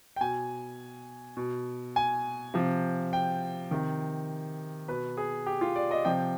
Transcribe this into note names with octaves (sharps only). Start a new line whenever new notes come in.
G5
B2 G#5
B2
G#5
C3 F3
G5
C3 D#3
B2 B4
G#4
G4
F4
D5
D#5
C3 F3 G5